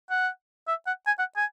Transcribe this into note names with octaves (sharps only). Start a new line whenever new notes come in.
F#5
E5
F#5
G#5
F#5
G#5